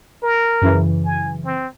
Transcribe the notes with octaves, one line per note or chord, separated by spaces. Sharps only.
A#4
F#2 C#3 E3
G#5
C4